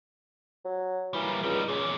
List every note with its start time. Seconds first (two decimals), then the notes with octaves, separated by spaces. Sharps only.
0.65 F#3
1.14 E3 G3 A#3
1.43 C#2 G3 D#4
1.68 E2 A#2 C#3